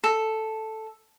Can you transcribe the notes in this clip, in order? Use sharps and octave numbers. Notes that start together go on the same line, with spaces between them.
A4